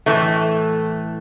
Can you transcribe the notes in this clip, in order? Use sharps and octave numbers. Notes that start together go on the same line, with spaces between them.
A2 E3 A3